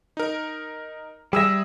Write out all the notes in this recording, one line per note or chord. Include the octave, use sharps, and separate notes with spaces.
D#4 A#4
G3 G#4 E5 E6 A#6